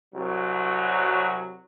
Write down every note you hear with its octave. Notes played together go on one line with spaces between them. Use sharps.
C2 F#3